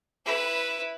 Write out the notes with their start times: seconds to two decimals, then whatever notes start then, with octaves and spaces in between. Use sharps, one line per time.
0.25 E4 B4